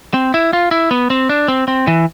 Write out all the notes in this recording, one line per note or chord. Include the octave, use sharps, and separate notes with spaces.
C4
E4
F4
E4
B3
C4
D4
C4
C4
E3